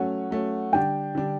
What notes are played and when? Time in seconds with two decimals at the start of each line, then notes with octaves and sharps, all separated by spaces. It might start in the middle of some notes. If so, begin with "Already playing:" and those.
Already playing: F#3 A3 C#4 F#5
0.31 F#3 A3 C#4
0.73 D3 G3 D4 G5
1.15 D3 G3 D4